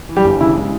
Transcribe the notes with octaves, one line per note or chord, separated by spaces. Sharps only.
E3
G3 G4
G1
C#3 E3 E4
G#3